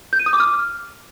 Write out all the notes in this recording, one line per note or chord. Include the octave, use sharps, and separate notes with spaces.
G6
D#7
D#6
D6
F6